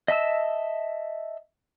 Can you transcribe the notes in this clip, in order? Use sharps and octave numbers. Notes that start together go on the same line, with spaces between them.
D#5 E5 A5 E6